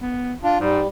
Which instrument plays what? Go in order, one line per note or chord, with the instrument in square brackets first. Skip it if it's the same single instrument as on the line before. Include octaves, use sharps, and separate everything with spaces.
[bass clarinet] B3
[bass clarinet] D4 [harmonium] F4
[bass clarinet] G#2 [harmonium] G3